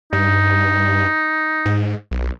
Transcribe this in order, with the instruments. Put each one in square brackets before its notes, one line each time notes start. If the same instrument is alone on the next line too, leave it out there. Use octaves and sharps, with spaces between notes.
[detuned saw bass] G2 [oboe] D#4
[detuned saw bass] G#2
B1